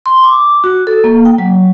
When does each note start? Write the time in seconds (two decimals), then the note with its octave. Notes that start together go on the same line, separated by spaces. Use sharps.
0.06 C6
0.24 D6
0.64 F#4
0.87 A4
1.04 A#3
1.25 G5
1.38 F#3